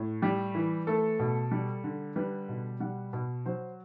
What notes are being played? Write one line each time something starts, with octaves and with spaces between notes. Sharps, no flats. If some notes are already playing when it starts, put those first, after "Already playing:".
Already playing: A2
G3 G4
E3
A3 A4
B2
G3
D3
G3 B4
B2
G3 F#5
B2
F#3 C5